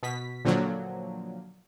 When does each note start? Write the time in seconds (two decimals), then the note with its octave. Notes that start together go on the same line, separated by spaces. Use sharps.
0.03 B2 B6
0.45 A#2 D3 F3 F#3